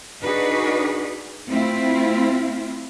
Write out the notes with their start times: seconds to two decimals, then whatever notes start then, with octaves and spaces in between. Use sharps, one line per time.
0.24 D4 D#4 F#4 G#4 B4
1.48 A3 C4 E4 F4